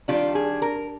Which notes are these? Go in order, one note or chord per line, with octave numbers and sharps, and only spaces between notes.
D#3 G3 D4 F4
G#4
A#4